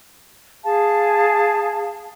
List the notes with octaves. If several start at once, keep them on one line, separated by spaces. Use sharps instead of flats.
G#4 F5 A5